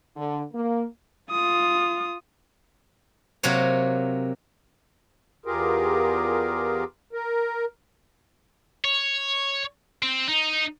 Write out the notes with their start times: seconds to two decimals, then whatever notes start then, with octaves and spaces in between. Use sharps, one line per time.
0.16 D3
0.53 A#3
1.31 F4 D#6
3.43 C3 F#3 A#3 C#5
5.46 E2 F4 G4 G#4 A#4
7.13 A#4
8.84 C#5
10.02 C4
10.29 D#4